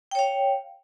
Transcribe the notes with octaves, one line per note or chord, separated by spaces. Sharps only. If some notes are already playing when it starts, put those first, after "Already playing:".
C#5 F5 G5